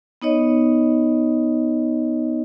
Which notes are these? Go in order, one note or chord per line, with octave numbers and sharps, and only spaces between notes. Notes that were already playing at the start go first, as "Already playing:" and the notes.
B3 D#4 C#5 D#5